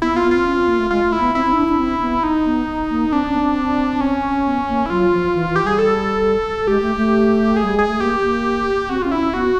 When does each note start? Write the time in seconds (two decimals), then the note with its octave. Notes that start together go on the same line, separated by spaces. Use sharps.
0.02 B3 E4
0.13 B3
0.16 F4
0.24 B3
0.31 C4 F4
0.46 C#4
0.57 C4
0.68 A#3
0.79 A3
0.91 G#3 F4
1.05 A3
1.12 E4
1.20 B3
1.35 C4 E4
1.46 C4
1.53 D#4
1.57 D4
1.68 D4
1.79 C4
2.01 B3
2.23 D#4
2.46 B3
2.90 A#3
3.12 C4 D4
3.27 C#4
3.35 B3
3.42 C4
4.01 C#4
4.45 B3
4.68 A#3
4.86 E4
4.90 F#3 F4
5.12 F3
5.34 E3
5.49 E3
5.56 G4
5.64 G3 G#4
5.79 A4
6.67 G#3 G4
6.82 A3
6.97 A3
7.57 G#4
7.64 G3
7.76 G#3 G#4
7.88 A3
8.00 A#3 G4
8.23 A#3
8.89 C4 F#4
9.02 C#4 F4
9.12 D4 E4
9.18 C#4
9.34 B3 F#4